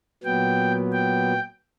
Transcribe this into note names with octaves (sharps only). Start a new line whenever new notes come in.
A#2 F#3 B3 G5
G5